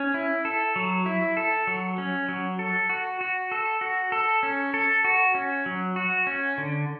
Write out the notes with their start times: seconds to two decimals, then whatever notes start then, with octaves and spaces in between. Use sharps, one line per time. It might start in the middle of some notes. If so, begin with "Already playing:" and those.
Already playing: C#4
0.14 E4
0.45 A4
0.76 F#3
1.06 E4
1.37 A4
1.67 F#3
1.98 C#4
2.29 F#3
2.59 A4
2.90 F#4
3.21 F#4
3.52 A4
3.81 F#4
4.12 A4
4.43 C#4
4.74 A4
5.05 F#4
5.35 C#4
5.66 F#3
5.96 F#4
6.27 C#4
6.58 D3